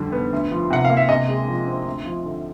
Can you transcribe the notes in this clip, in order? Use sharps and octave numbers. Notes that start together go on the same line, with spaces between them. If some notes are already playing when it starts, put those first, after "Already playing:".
Already playing: F2 D3 G3
B3
D2
F3
C3 F#5
F5
A#3
E5
C3 D#5
G#3
F3
C4
D2
F3
D3